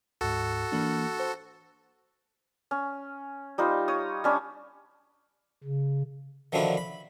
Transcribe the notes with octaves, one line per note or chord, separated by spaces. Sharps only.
D2 G#2 F#4 A4
E3 A#3 D4
C5 A5
C#4
G3 D#4 F4 C5
C#5 D#6
G3 C#4 D4
C#3
D3 D#3 F3 F#3 D4 E4
B5